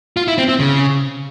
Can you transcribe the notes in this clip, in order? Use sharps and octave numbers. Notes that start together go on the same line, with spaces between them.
F4
E4
C4
C4
C#3